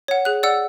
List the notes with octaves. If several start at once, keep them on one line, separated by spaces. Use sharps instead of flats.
C#5 F#5
G#4 F#6
D5 F#5 E6